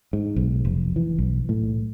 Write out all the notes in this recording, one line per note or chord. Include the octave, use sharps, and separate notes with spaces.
G#2
B1
F1
E3
B1
A2